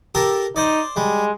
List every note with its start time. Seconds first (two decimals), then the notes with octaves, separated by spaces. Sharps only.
0.15 G4 A4 A#4
0.56 D#4 C5 D5
0.96 G3 G#3